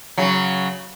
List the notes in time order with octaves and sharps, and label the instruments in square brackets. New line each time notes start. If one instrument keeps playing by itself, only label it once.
[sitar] C#3 F#3